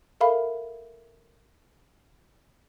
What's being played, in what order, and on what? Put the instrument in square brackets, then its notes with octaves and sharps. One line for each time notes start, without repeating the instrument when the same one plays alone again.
[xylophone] A4 A#4 E5 F5 B5